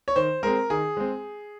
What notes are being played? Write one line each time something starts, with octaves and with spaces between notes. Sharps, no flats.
C#5
D#3 C5
G#3 C4 A#4
D#3 G#4
G#3 C4